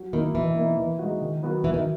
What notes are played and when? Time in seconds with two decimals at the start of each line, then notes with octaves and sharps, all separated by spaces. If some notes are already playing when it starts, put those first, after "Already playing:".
Already playing: F#3
0.13 D#3 A#3 E4 A#4
0.34 B2 E3
0.56 A#3 D#4
0.78 E3
0.99 G#3 D#4 F#4
1.21 D#3
1.43 F#3 B3 F#4 A#4
1.64 E3 F#3
1.74 D#3